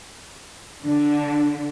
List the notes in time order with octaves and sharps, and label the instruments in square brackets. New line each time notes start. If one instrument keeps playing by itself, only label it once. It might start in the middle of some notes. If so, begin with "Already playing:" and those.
[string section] D3 [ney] D4